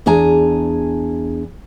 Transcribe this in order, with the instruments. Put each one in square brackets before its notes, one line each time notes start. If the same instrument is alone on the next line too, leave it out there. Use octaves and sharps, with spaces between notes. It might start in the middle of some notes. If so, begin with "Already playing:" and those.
[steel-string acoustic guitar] E2 D4 G#4 G#5 A#5